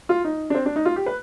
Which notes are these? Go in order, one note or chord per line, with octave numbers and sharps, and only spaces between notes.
F4
D#4
D4
C4
D4
D#4
F4
G4
B4